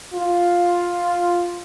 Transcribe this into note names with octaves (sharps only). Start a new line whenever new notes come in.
F4